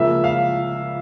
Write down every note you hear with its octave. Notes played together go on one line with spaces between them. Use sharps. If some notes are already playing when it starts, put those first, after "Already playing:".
Already playing: C#2 C#3 F3 A#3 E5
F5